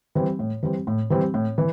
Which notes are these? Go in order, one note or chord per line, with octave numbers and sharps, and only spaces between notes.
E3 G3 C4
A2
E3 G3 C4
A2
E3 G3 C4
A2
E3